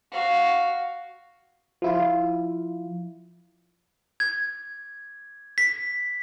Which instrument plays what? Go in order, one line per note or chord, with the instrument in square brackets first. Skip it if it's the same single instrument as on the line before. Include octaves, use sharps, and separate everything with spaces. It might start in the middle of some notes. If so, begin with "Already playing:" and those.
[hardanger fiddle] F#4 F5
[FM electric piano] F3 E4 F4
[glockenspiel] G#6
B6